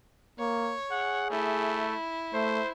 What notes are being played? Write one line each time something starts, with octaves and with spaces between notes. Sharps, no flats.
A#3 C#5
G#4 F#5
A3 E4
A3 C5